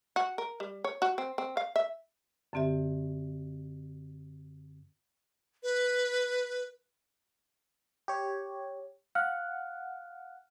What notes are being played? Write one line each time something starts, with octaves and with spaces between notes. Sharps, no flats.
F#4
A#4
G3
C#5
F#4
C4
C4
F5
E5
F#2 D3 C4 G4 E5
B4
G4 C#5
F5 F#5 F6